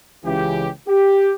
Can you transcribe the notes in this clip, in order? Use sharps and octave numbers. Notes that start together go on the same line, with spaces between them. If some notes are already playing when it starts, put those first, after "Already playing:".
C#2 C#3 E3 G4
G4